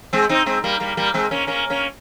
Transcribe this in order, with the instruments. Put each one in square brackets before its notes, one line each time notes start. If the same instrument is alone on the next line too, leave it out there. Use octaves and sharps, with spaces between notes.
[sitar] G#3 C4
C4 D#4
G#3 C4
G3 A#3
G3 A#3
G3 A#3
G#3 C4
A#3 C#4
A#3 C#4
A#3 C#4